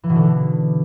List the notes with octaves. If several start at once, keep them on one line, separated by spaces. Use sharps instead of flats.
E3
B2
D3